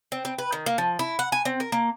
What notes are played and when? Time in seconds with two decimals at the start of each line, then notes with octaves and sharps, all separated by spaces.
0.12 C4
0.25 C4
0.38 B4
0.52 D#3
0.66 A#3
0.78 F3
0.99 E4
1.19 F#5
1.32 G#5
1.45 C4
1.60 A#4
1.72 A#3